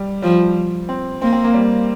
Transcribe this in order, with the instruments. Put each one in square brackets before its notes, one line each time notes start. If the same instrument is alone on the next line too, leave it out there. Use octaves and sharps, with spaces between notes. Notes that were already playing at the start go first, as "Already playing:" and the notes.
Already playing: [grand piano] G3
[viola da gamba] F3 [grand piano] G3
[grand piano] C4
[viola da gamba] A#3 [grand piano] C4
[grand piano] C4
A#3
G3